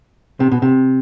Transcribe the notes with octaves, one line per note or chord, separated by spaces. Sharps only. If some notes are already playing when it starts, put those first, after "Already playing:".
C3
B2
C3